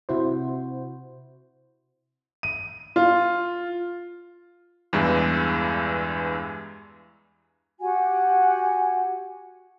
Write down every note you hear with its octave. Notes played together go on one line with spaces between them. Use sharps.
C3 E4 F#4 C5
D#7
F4
E2 G2 E3 G#3
F#4 G4 F#5 G#5